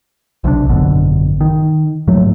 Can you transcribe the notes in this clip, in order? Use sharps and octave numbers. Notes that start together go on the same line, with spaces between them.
B1 C3 F3 D4
G#1 F#2 B2 D3
D#3
G#2 F3 F#3 A3